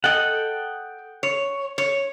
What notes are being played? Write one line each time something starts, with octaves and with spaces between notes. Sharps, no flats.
A4 D#5 F#5 G5
C#5
C#5